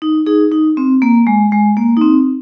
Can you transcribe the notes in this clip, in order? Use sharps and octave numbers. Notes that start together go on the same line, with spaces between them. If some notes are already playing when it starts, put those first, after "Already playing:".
D#4
D#4 G#4
D#4
C4
A#3
G#3
G#3
A#3
D#4
C4